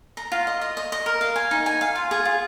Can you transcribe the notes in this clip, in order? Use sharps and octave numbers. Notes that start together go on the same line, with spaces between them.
A#5
F4
D#5
D#5
D#5
D#5
A#4
F5
G#5
D#4
G#5
F5
F4
G#4
F4